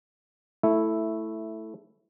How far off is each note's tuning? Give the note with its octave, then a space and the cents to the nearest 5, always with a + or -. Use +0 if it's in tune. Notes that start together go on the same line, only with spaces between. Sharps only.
A3 +0 E4 +0